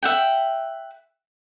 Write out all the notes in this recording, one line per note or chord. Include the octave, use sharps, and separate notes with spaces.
E5 F#5 G5